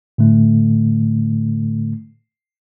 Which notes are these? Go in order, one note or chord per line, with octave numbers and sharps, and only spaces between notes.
A2 D3 A3